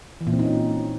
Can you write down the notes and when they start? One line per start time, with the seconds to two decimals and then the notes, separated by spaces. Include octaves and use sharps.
0.21 E3
0.27 A#2
0.33 C4
0.39 D#4
0.45 C#4